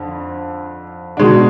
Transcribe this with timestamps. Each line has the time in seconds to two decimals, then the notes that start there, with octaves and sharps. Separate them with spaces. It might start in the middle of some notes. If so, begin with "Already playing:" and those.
Already playing: F2 D3
1.17 B2 G#3 D4